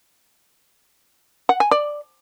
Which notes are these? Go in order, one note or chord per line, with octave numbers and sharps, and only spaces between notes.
F#5
G#5
D5